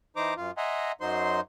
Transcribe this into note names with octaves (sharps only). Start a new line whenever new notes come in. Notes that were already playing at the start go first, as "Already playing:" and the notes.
E3 D#4 C5 A#5 D6
F#2 F4
D#5 E5 F#5 G#5 A#5 C6
F#2 F#3 D#4 C5 C6